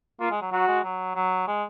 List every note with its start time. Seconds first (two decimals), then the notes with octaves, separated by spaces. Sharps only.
0.20 A#3 F4
0.31 G#3
0.42 F#3
0.52 F#3 F#4
0.68 G#3
0.84 F#3
1.15 F#3
1.47 G#3